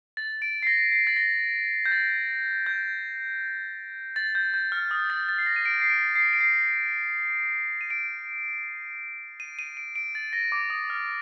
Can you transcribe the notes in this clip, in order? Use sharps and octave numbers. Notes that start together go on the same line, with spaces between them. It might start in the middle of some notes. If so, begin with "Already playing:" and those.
A6
D7
C7
A#6
C7
A6
A#6
G6
A6
G6
A6
G6
G6
F6
D#6
A6
A6
C7
A#6
D#7
D7
C7
D7
C7
D7
C7
D#7
D7
D#7
D#7
D7
D7
A6
A#6
D6
D#6
F6